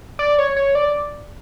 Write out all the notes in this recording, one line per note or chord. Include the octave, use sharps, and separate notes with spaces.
D5
C#5
C#5
D5